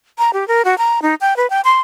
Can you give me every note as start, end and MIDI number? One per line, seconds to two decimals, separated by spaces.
0.18 0.31 82
0.33 0.47 67
0.48 0.62 70
0.65 0.77 66
0.78 1.02 82
1.02 1.15 63
1.21 1.36 79
1.37 1.49 71
1.50 1.61 79
1.64 1.80 84